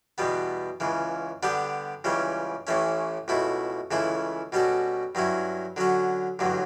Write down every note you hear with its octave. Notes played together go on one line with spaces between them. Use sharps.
E2 B2 G3 B3
C#2 C#3 E3
D3 G3 B3 D4 G4
C#2 C#3 E3 G3 C#4
A1 A2 E3 A3 C#4
C#2 B2 A3 E4
C#2 C#3 E3 A3 E4
B2 G3 C#4 F#4 A4
G2 F#3 C#4 E4
D3 F#3 C#4 F#4
A1 G2 D3 F#3